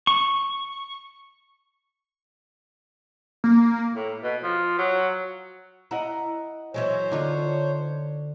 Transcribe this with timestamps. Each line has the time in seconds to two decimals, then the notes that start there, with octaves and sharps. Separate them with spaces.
0.07 C#6
3.44 A#3
3.95 A2
4.23 B2
4.43 F3
4.78 F#3
5.91 E4 D#5 F#5 A#5
6.74 E3 F#3 G#3 C5 C#5
7.12 D3 D#4 F4